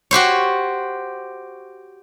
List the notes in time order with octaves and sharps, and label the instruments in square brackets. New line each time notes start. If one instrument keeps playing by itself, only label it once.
[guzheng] F#4 G4 C5 C#5